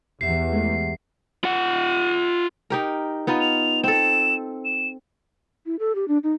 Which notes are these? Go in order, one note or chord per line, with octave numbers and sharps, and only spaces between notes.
E2 G4 E5 F#5 C7
G#3 A3
F4 F#5
D#4 G4 A#4
B3 D#4 F4
F7
C4 A4 E7
E7
E4
A4
G4
D4
D#4